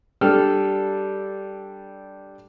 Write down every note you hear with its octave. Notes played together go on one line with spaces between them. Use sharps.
G3 D4 A4 F6